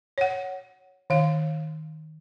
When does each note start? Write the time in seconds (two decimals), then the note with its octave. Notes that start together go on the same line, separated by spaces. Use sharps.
0.18 C#5 F#5
1.10 D#3 F5